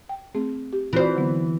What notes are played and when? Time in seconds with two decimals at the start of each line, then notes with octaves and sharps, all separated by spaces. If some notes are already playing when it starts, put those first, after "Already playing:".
0.09 G5
0.35 A3 C4 G#4
0.73 G4
0.93 E3 C4 F4 F#4 C5
1.15 D3 F#3 B3